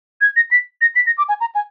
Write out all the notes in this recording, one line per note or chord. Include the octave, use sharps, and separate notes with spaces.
G#6
A#6
B6
A#6
B6
A#6
D6
G#5
A#5
G#5